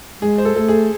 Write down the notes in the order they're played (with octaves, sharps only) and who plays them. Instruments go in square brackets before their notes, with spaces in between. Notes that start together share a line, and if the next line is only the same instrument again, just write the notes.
[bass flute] G#3 [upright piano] G#4
[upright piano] C5
A4
[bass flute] A3 [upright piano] A4
[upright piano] G#4